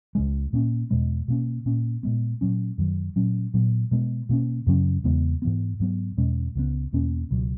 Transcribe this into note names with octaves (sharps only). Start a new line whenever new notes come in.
C#2 C#3 G#3
A#2 A#3 C#4
E2 B2 G#3 B3
B2 A#3 C#4
A#2 A#3 C#4
A#2 G#3 B3
A#2 F#3 C#4
F#2 D#3 F#3
A#2 F#3 C#4
A#2 F#3 B3
B2 G#3 B3
B2 A#3 C#4
F#2 C#3 F#3 C#4
E2 C#3 G#3 B3
G#2 E3 B3
G#2 F#3 B3
E2 B2 G#3 C#4
C#2 C#3 G#3 B3
E2 B2 A#3 C#4
C#2 B2 F#3